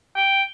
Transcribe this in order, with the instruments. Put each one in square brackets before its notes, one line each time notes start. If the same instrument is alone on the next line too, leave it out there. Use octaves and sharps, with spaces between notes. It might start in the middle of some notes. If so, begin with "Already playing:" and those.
[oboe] G5